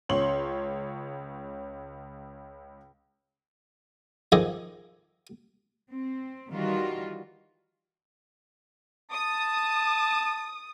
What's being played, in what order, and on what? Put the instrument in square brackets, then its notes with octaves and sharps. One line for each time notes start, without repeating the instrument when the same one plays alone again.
[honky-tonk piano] C#2 C#4 C#5 C6 F#7
[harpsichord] D#3 F3 G#4 A4 D#5 D6
[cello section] C4
D#3 E3 G3 F4 F#4
[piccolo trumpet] A5 [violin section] D#6